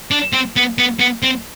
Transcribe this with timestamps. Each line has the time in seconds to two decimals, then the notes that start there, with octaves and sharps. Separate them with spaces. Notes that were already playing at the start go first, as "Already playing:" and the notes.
0.11 D4
0.33 C4
0.56 B3
0.78 B3
1.00 B3
1.23 C4